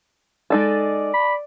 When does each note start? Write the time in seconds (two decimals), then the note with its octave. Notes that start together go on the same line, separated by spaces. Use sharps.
0.50 G#3 D#4 A4 D5
1.14 B5